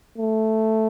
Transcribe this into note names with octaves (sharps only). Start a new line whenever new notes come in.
A3